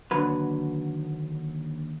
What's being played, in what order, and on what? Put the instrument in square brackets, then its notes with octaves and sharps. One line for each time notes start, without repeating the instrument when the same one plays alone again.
[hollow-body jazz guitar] D#2 D3 F#3 B4